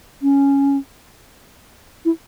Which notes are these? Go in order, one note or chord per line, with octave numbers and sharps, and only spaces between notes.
C#4
E4